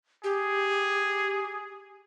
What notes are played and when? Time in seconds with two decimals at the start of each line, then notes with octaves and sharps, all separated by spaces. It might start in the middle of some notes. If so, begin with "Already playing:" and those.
0.24 G4 G#4